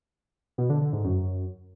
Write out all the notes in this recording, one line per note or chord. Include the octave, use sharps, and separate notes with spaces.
B2
D3
D3
G#2
F#2